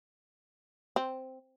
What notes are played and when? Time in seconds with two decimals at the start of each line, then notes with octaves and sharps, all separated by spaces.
0.96 C4